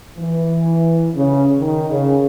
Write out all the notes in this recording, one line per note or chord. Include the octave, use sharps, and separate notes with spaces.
E3
C#3
D#3
C#3